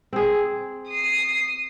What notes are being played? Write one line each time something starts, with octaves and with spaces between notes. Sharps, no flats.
C4 G#4
D#6 C7